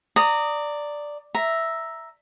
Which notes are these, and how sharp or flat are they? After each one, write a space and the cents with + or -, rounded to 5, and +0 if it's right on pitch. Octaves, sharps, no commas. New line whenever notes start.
D5 +0 A#5 -25 D#6 +0
E5 +0 A#5 +5